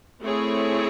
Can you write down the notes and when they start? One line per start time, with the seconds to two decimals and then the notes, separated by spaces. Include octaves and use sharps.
0.23 A3 C4 E4 G#4 C#5